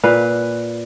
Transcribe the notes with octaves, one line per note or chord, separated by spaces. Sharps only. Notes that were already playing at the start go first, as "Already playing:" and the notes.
A#2 B4 F5